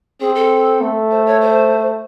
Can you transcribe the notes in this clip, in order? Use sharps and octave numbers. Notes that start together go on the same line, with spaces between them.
C4 G#4
A4
A3
C5
C#5
C5